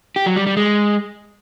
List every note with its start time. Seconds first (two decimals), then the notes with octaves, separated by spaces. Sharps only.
0.16 G4
0.26 F#3
0.36 G3
0.47 G3
0.57 G#3